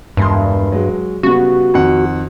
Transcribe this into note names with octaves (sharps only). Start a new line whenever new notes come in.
E1 G2 C6
F#3 G#3
C#3 G3 B3 F#4
F2 D#3 F#5